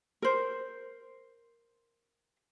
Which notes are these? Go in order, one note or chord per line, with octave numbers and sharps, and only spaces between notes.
A#4 C5